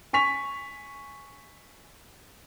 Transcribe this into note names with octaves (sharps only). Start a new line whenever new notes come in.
G#5 C#6 B6 F7